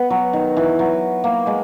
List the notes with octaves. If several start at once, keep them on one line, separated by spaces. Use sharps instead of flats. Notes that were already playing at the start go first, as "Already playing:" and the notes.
Already playing: B3
F#3
D#3
E3
F#3
A#3
G#3